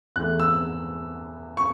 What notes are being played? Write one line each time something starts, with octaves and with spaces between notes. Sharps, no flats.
E2 E3 A3 F#6
E6
C#6